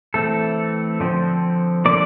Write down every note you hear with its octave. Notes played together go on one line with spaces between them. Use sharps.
E3 A3 C4 A4
D3 F3 C4
D3 F3 A#3 D5